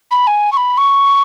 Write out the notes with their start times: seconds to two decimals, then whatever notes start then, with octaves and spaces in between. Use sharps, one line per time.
0.11 B5
0.27 G#5
0.52 C#6
0.56 B5
0.77 C#6